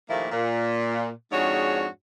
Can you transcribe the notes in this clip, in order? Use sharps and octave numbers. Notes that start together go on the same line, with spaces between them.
D#2 A#2 F3 A3 A#3 E4
A#2
F2 G#2 D4 F#4 G#4 C#5